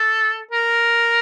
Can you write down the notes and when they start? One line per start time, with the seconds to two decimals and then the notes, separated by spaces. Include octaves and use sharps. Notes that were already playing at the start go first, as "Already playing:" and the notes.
Already playing: A4
0.51 A#4